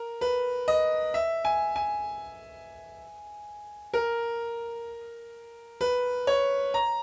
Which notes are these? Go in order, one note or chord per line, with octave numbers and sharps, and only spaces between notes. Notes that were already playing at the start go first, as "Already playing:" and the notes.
Already playing: A#4
B4
D#5
E5
G#5
G#5
A#4
B4
C#5
A#5